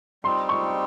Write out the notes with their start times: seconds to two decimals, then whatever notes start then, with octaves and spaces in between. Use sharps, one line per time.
0.24 G3 C4 D#4 C6
0.49 C#6